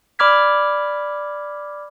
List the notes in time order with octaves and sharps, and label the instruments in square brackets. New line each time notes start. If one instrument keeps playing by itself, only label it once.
[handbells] D5 B5 D6 F6 G#6 B6